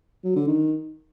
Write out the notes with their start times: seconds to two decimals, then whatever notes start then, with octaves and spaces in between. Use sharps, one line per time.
0.24 F#3
0.36 D3
0.47 D#3